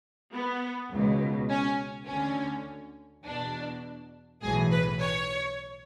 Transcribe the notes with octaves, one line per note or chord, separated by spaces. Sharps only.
B3
C#2 B2
C#4
D2 D3 C#4
E2 B2 D4
B1 A2 E3 G#4
B4
C#5